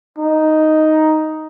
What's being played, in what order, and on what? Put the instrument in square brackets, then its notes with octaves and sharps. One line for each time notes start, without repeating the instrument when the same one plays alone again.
[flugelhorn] D#4